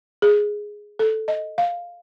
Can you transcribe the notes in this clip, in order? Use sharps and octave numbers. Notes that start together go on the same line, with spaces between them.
G#4
A4
D#5
F5